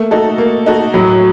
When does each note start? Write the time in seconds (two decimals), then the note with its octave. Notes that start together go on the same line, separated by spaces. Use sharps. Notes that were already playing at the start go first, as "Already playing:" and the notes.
Already playing: A3 A#3
0.11 D#4 F#4 A4
0.38 A#3
0.66 D#4 F#4 A4
0.94 A2 F#3